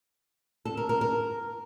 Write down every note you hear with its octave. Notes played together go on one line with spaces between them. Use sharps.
A4
A#4
A#4
A#4